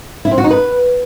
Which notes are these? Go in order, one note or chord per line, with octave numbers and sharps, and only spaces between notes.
E4
C4
F#4
D#4
B4